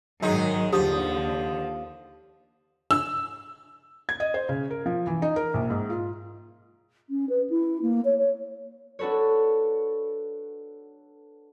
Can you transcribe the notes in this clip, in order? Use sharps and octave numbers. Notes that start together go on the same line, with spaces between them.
G#2 D#3 F#3 G#3 D#4
D#2 D3 F3 G4 D#6
E6
G#6
D#5
C5
C#3
A#4
F3
E3
D#4
A#4
A#1
G#2
F4
C#4
B4
E4
A#3
C#5
C#5
D4 F#4 A4 B4 C#5